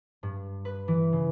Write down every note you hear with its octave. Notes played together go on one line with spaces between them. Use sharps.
G2
B4
E3
C#3